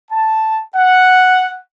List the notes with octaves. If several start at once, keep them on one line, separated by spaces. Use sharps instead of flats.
A5
F#5